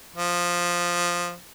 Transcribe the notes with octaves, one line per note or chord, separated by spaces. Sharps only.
F3